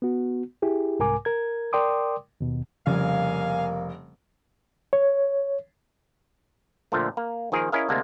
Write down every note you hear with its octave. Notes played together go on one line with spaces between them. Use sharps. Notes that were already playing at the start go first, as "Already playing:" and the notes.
B3 F#4
E4 G4 G#4
C2 G#2 A#4 G#5 D6
A#4 G#6
A#4 D5 G5 C6 D6 D#6
D#2 B2
F1 C#3 F3 G3 A#3 F5 G#5
C#5
A#2 D3 F3 A3
A#3
D#3 F3 A#3 G#4 A#4
C#4 E4 G#4 A#4 D#5 F5
D2 C3 G#3 A#3 A5